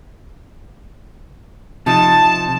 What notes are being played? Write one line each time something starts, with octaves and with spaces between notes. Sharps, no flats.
C3 F3 D#4 A5